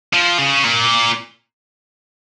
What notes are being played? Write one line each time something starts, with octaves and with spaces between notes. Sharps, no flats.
F3
C#3
A#2